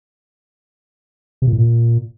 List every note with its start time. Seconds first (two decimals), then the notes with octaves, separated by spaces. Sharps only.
1.42 C3
1.47 A#2
1.53 A2
1.58 A#2